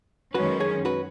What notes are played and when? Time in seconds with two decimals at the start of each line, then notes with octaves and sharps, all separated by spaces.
0.35 F#2 D#3 G#3 C#4 F#4 B4
0.60 G#4 C#5
0.85 F#4 B4